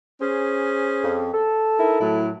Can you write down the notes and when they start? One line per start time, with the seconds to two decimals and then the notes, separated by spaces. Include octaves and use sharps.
0.21 C#4 G#4 C5
1.03 F2
1.34 A4
1.78 D#4 E4 A#4
2.01 A2 F#3 E4